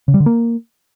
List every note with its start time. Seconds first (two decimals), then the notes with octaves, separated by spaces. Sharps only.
0.08 C#3
0.14 G3
0.20 D3
0.26 A#3